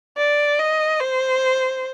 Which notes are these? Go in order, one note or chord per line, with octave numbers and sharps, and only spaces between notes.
D5
D#5
C5